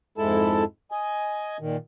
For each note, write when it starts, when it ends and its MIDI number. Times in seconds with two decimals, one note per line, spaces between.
0.18 0.64 41
0.18 0.64 44
0.18 0.64 56
0.18 0.64 64
0.18 0.64 69
0.18 0.64 81
0.91 1.57 75
0.91 1.57 80
1.60 1.77 46
1.60 1.77 51